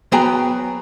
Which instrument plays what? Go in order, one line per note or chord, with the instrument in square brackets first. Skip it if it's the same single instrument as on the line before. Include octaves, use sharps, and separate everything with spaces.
[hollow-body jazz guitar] F#3 B3 G#4 G5 G#5 A#5